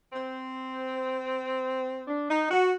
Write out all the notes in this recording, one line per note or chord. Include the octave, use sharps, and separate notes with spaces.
C4
D4
D#4
F#4